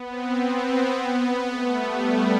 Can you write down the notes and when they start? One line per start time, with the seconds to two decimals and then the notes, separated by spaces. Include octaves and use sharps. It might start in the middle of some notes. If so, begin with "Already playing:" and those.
Already playing: B3
0.09 C4
0.36 B3
1.49 A3
1.78 G3